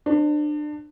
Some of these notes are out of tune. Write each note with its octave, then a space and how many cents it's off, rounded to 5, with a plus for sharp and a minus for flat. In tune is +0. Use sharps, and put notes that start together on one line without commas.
D4 +30 C5 +0